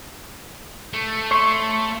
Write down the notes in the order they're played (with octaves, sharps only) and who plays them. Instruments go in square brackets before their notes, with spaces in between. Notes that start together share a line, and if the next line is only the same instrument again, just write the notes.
[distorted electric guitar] A3
[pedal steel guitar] C#5 C6 C#6